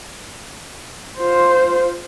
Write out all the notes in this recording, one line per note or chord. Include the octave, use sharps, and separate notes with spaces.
F4 C5